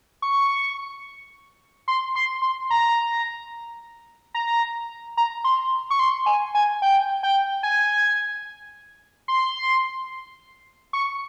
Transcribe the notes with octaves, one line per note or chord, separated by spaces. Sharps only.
C#6
C6
C6
C6
A#5
A#5
A#5
C6
C#6
C6
G#5
G#5
G5
G5
G#5
C6
C#6